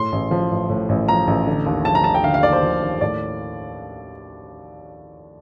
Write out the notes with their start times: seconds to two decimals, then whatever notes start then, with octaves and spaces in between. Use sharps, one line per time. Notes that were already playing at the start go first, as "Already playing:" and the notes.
Already playing: A2 C6
0.12 A1
0.31 F3
0.50 A1
0.70 A2
0.89 A1
1.08 F3 A#5
1.27 A1
1.47 D3
1.66 D#2
1.85 F3 A5
1.95 A#5
2.04 D#2 A5
2.14 G5
2.24 D3 F5
2.34 F5
2.43 D#2 D5
2.53 C5
2.63 F3
2.82 D#2
3.01 A2 D5